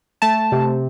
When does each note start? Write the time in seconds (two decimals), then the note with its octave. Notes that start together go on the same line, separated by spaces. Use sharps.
0.22 A3 A5
0.52 C3